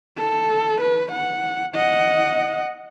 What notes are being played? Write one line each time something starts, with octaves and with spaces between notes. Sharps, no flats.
A4
B4
F#5
D#5 F#5